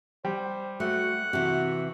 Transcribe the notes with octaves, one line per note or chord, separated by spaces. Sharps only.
G3 C5
A3 F#4 F#5 F#6
C3 E3 F#4